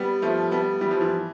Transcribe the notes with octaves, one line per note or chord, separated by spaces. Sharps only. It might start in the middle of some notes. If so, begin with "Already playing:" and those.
Already playing: G3 B3
F3 A3
G3 B3
E3 G3
F3
E3